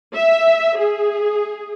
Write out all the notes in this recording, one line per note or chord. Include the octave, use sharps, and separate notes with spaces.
E5
G#4